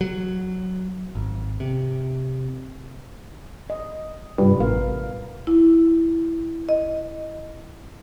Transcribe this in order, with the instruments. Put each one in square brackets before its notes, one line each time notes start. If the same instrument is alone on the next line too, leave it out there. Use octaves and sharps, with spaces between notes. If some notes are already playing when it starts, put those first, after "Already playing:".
[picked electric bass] F#3
G#1
C3
[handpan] D#5
[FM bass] G2 [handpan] C3 F4 B4
[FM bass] A1 [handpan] B3 A#4 F5
[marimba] E4
D#5